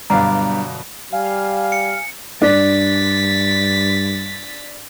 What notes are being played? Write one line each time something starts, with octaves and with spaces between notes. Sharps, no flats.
G1 G2 B2 F#3 D5 F5 A#5 B5
G3 F5 G#5
C#7
G2 D4 A6 B6